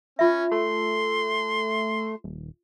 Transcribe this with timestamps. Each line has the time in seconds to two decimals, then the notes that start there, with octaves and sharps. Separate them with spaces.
0.19 C#4 F4 E5
0.52 A3 C6
2.24 D#1